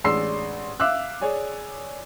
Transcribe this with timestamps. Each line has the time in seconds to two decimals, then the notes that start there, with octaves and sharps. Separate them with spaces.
0.04 A1 G#3 D4 C6 E6 C7
0.80 E5 F5 D6 E6 F#6
1.21 G#4 C#5 D5 G#5